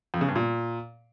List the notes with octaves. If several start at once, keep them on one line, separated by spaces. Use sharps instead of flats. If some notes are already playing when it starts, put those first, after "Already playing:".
F2
C#3
G2
A#2